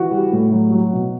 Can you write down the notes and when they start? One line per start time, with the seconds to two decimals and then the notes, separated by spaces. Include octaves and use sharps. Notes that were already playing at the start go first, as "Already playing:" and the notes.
Already playing: E3 F#4
0.11 G3
0.33 A2
0.52 F#3
0.72 F#3
0.93 B2